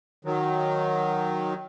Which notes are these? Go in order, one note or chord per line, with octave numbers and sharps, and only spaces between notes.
D#3 F#3